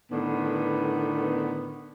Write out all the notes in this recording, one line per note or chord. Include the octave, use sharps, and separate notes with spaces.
A2 D3 D#3 B3